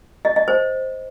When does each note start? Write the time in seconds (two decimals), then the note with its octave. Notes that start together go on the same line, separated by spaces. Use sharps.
0.25 D#5
0.36 D#5
0.48 C5